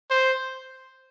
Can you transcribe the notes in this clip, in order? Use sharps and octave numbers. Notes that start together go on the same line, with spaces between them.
C5